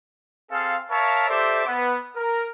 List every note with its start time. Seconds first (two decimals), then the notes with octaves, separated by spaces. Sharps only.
0.51 C4 G#4 A4 F5
0.91 A#4 C#5 E5 F5 A5
1.29 G4 A4 C5 D5 E5 D6
1.66 B3
2.16 A#4